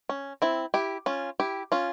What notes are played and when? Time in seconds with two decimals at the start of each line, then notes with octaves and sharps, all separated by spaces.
0.09 C#4
0.42 C4 E4
0.74 E4 G4
1.06 C#4 F4
1.40 E4 G4
1.72 C#4 F4